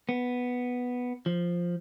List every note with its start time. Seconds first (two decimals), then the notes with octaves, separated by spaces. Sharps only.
0.09 B3
1.26 F3